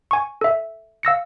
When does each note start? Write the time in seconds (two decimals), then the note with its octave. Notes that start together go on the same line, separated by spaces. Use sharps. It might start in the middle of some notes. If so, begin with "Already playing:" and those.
0.11 G#5 C#6
0.41 A4 E5
1.03 F5 E6 A#6 C#7